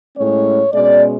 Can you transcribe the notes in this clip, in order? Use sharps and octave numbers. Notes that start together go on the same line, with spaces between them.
A2 G#3 C#4 C#5
B2 G#3 C#4 D5